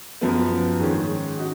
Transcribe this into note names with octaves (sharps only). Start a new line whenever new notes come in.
F#2 F3 B3
G#2 D#3 G#3 C#4
D#4 F#4